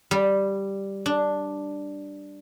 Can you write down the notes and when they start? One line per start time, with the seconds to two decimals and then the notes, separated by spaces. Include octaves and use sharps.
0.11 G3
1.06 D4